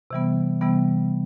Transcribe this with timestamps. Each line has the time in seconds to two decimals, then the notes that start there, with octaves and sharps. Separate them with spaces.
0.11 C3 E3 G3 B3
0.61 C3 E3 G3 B3